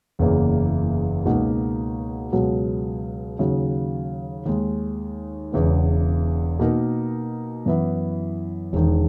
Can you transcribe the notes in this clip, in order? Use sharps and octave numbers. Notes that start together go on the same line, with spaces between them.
F#1 E2 C#3 E3 A#3
C#2 B2 A#3 D#4 F#4
C#2 B2 F#3
D#2 C#3 F#3
D#2 D#3 G#3
E1 E2 C#3 E3 B3
B2 A#3 D#4 A#4
F#2 E3 B3 E4
E1 E2 D#3